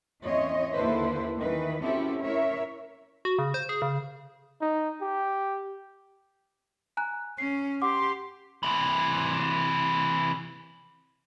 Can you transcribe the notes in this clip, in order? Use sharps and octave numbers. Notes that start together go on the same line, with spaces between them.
E2 C4 C#4 E4 C#5 D#5
D#2 D3 E4 A4 B4 C5
D#3 E3 B4
C4 C#4 E4 F#4 G4 A4
E4 A#4 C#5 E5
F#4
C#3
C5
G#4
C#3
D#4
G4
G#5 A#5 F#6
C#4 C7
G4 F#5 C6 D6
C3 E3